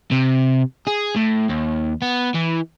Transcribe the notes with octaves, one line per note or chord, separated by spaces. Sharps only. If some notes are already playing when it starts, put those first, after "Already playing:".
C3
G#4
A2
D#2
B3
E3